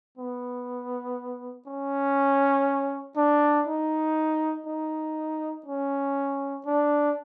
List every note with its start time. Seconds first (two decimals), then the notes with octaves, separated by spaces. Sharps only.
0.18 B3
1.67 C#4
3.17 D4
3.67 D#4
4.66 D#4
5.66 C#4
6.66 D4